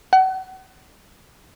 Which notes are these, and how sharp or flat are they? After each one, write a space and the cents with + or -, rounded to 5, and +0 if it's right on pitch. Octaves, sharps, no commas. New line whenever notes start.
F#5 +35